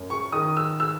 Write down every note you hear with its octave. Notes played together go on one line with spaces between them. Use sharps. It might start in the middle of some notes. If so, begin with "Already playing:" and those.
Already playing: F#2
C#6
D#3 D#6
E6
E6